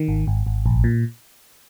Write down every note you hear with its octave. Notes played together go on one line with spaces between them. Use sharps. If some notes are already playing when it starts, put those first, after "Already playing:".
Already playing: D#3
G#1
G#1
G#1
A#1
A#2